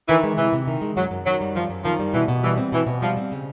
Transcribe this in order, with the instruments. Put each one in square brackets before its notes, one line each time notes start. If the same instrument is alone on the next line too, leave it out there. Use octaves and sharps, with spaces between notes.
[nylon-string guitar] D#3 [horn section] E3
[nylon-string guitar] G#3
[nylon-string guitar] C3 [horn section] E3
[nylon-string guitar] C3
D#3
G#3
[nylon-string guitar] F#2 [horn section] F#3
[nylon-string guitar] F#2
[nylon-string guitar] D#3 [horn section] F#3
[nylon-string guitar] G3
[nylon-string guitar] F#2 [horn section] F3
[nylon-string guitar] F#2
[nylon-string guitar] D#3 [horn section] F3
[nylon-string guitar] G3
[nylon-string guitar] B2 [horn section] E3
[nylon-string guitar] B2
[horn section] E3 [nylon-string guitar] G3
[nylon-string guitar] C4
[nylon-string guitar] B2 [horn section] E3
[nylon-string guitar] B2
[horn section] F3 [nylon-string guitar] G3
[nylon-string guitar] C4
C#3